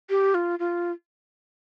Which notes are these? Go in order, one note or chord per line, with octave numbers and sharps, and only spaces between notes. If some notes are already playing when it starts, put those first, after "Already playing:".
G4
F4
F4